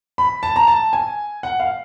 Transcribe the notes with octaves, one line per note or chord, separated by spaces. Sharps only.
B5
A5
A#5
A5
G#5
F#5
F5